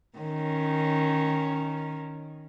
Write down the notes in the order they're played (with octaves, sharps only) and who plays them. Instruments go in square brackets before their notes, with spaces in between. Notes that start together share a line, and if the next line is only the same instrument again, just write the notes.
[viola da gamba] D#3 C#4